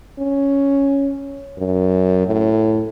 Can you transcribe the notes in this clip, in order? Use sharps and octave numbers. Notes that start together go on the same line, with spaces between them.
C#4
F#2
A2